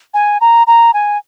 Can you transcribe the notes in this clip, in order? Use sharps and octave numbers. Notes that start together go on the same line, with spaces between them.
G#5
A#5
A#5
G#5